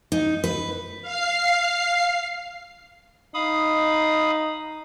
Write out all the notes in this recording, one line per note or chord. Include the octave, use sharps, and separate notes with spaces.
D#4
B4
F5 C7
D#4 F5 B5 D#6